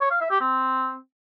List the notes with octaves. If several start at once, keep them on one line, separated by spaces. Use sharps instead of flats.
C#5
F5
E5
G4
C4